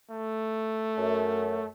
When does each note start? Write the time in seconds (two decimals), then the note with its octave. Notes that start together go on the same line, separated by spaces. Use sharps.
0.10 A3
0.96 F#2